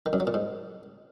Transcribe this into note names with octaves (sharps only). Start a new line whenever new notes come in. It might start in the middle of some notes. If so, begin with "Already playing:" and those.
D#3
F#2
F#3
A#2
G#2